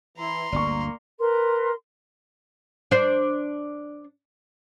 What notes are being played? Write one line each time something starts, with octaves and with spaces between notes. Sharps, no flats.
E3 E4 A#5 C6
G1 D2 A#3 D5 C#6
A#4 B4 C6
D4 C5